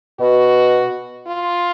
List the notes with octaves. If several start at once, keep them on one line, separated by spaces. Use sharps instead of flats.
B2 F#4
F4